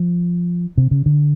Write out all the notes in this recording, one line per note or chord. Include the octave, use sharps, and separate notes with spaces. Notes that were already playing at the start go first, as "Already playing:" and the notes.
Already playing: F3
C3
C#3
D3